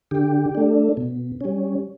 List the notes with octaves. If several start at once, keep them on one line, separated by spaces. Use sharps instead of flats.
D3 G4
A3 D4
B2
G3 C#4